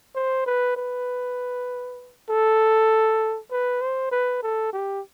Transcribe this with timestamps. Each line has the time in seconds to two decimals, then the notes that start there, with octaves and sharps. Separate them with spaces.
0.15 C5
0.46 B4
0.77 B4
2.29 A4
3.52 B4
3.82 C5
4.11 B4
4.43 A4
4.73 G4